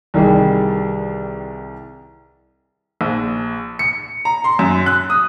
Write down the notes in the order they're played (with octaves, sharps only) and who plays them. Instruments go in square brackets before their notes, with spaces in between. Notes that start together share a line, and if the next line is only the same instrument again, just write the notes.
[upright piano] C2 D#3 E3 G3 G#4
[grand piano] A#1
C#7
A#5
C6
F#2
F#6
D#6